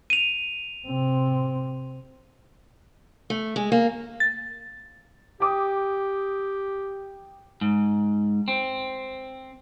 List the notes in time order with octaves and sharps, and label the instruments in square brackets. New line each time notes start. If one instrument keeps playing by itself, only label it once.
[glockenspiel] D#7 F7
[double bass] C3 C4
[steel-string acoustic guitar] A3
G#3
A#3
[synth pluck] A6
[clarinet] G4 [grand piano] G5 D6 D#6
[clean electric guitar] G#2
C4